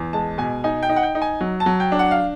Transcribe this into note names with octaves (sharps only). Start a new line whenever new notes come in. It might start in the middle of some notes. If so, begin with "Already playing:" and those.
Already playing: E2
G#3 A5
B2 G#5
D#4 G#5
G5
D#4
F#5
G5
D#4
G#5
F#3
A5
F#3
G5
D4
F#5
F5